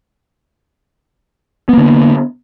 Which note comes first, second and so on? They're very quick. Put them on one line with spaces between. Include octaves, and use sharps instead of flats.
B3 A#3 D3